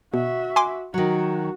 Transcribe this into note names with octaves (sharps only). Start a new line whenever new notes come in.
B2 F#4 E5
G#5 C6 D6
D#3 F#3 F#4